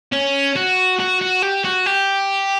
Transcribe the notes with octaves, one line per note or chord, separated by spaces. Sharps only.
C#4
F#4
F#4
F#4
G4
F#4
G4